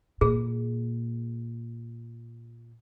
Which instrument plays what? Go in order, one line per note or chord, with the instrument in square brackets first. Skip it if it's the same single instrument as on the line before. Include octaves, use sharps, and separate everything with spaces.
[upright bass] A#2 [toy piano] G#4